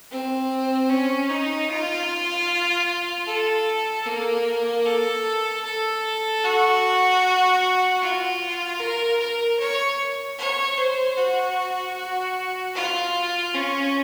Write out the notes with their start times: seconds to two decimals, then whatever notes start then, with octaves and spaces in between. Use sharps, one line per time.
0.11 C4
0.90 C#4
1.29 D#4
1.69 F4
3.27 A4
4.06 A#3
4.85 A4
5.65 A4
6.44 F#4
8.01 F4
8.80 A#4
9.19 A#4
9.59 C#5
10.39 C#5
10.78 C5
11.17 F#4
11.97 F#4
12.75 F4
13.54 C#4